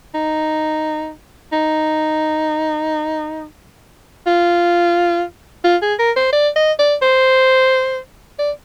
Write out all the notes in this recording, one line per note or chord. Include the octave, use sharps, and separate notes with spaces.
D#4
D#4
F4
F4
G#4
A#4
C5
D5
D#5
D5
C5
D5